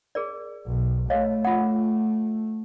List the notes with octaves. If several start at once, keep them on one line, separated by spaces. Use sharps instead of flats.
G#4 A#4 D5
B1
A3 C#5 D#5 F5
F4 F#5